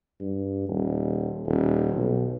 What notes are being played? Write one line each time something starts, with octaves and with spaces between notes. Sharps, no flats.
G2
D#1
D#1
B1